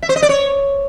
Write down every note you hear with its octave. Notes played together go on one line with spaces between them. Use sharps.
E5
C5
D#5
D5
C#5